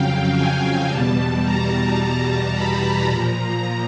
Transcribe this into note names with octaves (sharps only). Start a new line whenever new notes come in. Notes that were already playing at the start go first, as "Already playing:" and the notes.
Already playing: F2 C#3 F#3 F5 G5
G#5
E2 B2 G3 A5
A#5
B5
A#2 F3 A#5